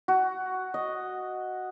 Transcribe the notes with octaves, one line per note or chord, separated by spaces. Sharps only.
F#4
D#5